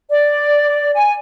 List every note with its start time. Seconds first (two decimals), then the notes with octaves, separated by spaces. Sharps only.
0.10 D5
0.94 G#5